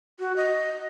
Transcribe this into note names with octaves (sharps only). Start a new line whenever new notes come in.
F#4
D#5